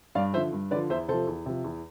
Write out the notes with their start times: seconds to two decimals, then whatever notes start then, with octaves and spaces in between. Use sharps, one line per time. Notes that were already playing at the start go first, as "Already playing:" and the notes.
0.15 G2 D5 F5
0.33 F3 C5 E5
0.37 D3
0.52 G2
0.71 D3 B4 D5
0.76 F3
0.90 E2 C5 E5
1.08 C3 F3 A4 C5
1.27 E2
1.46 C3 F3
1.64 E2